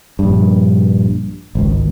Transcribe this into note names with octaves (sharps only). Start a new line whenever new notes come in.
A#1 G2
G#1 C#2